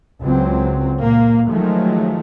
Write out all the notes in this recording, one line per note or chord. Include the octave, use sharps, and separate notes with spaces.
C#2 F#3 C4
A#2 A#3
D#3 F3 F#3 G#3 A3